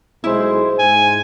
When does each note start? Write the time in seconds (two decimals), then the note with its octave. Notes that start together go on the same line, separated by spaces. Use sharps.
0.24 B1 G#3 E4 C5
0.79 G#2 G#5